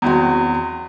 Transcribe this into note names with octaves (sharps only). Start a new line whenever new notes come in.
E2 D#3 F#3 C4 F#4